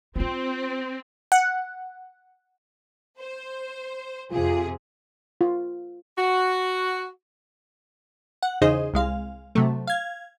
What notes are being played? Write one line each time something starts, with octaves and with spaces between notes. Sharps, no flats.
C4 E4 F4
F#5
C5
F2 C3 F4 G#4
F4
F#4
F#5
E2 C#3 D#4 G#4 C5 D#5
C2 G#3 F5
C3 F#3 A3
F5 G#6